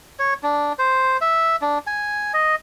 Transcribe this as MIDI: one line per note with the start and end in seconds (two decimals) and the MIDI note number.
0.19 0.34 73
0.43 0.73 62
0.79 1.17 72
1.21 1.56 76
1.62 1.78 62
1.87 2.33 80
2.34 2.55 75